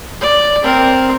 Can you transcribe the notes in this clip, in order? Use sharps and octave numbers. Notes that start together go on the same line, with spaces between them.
D5
C4 A#4